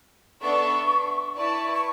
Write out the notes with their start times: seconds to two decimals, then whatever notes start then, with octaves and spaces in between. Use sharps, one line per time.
0.42 B3 D4 A4 E5 C#6
1.37 E4 B4 D5 A5 C#6
1.73 C#6